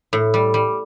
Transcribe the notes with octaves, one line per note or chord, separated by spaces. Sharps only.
A2
G3
G3